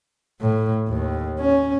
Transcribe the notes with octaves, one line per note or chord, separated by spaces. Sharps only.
A2
D#2
C#4